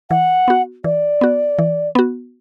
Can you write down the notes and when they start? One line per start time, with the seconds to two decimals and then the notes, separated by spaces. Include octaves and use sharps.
0.10 E3 F#5
0.48 B3 F#4
0.84 E3 D5
1.21 B3 F#4
1.59 E3
1.95 B3 F#4